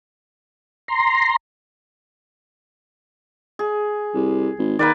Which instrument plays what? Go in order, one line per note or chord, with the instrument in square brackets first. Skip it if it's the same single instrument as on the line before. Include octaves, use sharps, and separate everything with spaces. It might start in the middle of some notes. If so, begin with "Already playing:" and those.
[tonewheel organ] A#5 C6
[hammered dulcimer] G#4
[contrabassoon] C2
G#1
[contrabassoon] D#3 [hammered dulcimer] A#3 B4 D5